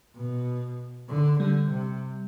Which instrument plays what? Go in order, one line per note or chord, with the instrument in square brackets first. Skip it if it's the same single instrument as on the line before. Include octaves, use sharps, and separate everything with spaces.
[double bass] B2
D3
[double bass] D3 [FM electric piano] G3
[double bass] C3